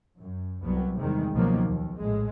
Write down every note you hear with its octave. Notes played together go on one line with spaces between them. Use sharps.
F#2
C2 F#3 G3 B3
E2 C3 D#3 G3 G#3
C#2 B2 D#3 F3 F#3 A#3
D#2
A#1 A2 G#3